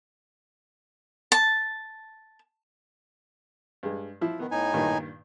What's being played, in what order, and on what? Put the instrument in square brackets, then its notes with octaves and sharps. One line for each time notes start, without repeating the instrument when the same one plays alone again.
[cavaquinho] A5
[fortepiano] G2 G#3
F3 E4
[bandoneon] D#3 [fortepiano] B3
[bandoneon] A2 D#4 G#5
[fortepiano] G2 A#2 D#3